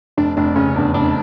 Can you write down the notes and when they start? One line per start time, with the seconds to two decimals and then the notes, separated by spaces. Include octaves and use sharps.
0.17 F1 D4
0.37 F1 D4
0.56 C#3 C#4
0.75 E2 D4
0.94 F1 D4